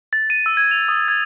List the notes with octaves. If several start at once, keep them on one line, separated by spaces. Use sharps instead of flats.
A6
D#7
E6
G#6
F7
D#6
G#6